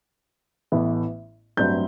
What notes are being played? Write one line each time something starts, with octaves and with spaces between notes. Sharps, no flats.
A1 A2 E3 B3
A1 G2 F#3 C4 E4 G6